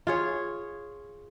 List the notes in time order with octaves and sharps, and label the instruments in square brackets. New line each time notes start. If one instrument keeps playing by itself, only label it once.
[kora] F4 G#4 C#5